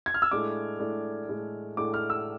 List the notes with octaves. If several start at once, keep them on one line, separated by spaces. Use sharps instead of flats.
G#6
F6
E6
A2 G#3 D4 D6
A2 G#3 D4
A2 G#3 D4
A2 G#3 D4 D6
F6
E6